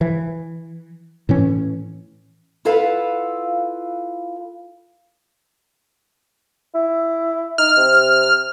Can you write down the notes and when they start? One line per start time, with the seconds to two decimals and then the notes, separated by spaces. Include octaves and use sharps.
0.01 E3
1.29 A2 E3 C#4
2.65 E4 F4 A4 B4 F5 F#5
6.74 E4
7.58 D#4 F6
7.77 C3